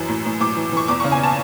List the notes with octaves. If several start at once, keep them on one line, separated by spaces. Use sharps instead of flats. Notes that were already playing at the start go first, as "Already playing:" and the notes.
Already playing: F#2 E3
A2
A2
A2 D6
E3
E3 C#6
E2 D6
C#6
C#3
G#5
A5